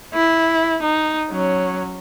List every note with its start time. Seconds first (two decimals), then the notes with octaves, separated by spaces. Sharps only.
0.14 E4
0.83 D#4
1.31 F#3 C#4